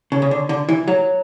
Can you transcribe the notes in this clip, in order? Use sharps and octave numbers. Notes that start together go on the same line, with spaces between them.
C#3
C#3
D3
D3
E3
F#3